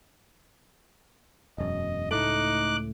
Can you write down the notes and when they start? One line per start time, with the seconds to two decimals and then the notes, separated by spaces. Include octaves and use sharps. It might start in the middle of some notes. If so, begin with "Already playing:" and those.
1.58 E1 F#2 D#5
2.11 C#2 A2 A3 D#4 D6 F#6